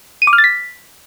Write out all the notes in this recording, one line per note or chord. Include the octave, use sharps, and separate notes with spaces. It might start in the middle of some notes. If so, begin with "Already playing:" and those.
D#7
D6
F6
A6
B6